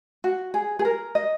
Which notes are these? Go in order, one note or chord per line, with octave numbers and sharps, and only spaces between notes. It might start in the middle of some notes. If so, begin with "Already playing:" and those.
F#4
G#4
G#4
A#4
D#5